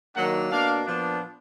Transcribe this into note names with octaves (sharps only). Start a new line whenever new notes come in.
D#3 F#3 A#3 D4 F#5
B2 A#3 D4 F5
A#2 F3 B3 D4